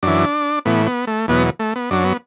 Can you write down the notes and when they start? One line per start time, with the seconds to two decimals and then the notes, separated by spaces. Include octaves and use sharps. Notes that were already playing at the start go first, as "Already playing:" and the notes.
0.03 F#2 E3 D4
0.65 A2 E3 B3
0.86 B3
1.07 A3
1.28 E2 B2 F#3 B3
1.59 A3
1.76 B3
1.91 F#2 F#3 D4
2.04 B3